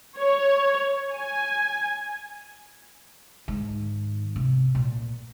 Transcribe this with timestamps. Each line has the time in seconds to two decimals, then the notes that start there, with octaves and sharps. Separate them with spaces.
0.19 C#5
1.13 G#5
3.48 G#2 D#3
4.36 C3
4.75 A#2